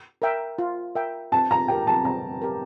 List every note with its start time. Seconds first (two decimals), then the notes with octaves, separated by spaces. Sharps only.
0.22 A#4 E5 G5
0.59 F4
0.95 A#4 E5 G5
1.32 C4 A5
1.51 A#5
1.68 G4 A#4 G5
1.87 A5
2.05 C4 A#5
2.42 G4 A#4